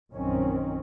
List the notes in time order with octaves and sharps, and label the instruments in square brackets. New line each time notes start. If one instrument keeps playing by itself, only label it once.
[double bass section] A#1 F#2 D#3 C4 C#4